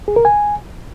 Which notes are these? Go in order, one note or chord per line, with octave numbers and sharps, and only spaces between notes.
G#4
A#4
G#5